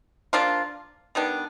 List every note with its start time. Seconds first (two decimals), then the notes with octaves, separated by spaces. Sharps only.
0.33 F3 A#3 D4 F4
1.15 D#3 G3 B3 D4